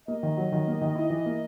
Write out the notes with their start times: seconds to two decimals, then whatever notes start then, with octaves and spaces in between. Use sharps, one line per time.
0.08 A#3 D#5
0.23 D#3
0.37 F#3
0.52 D#3
0.67 A#3
0.81 D#3
0.96 E4
1.10 E3
1.26 A#3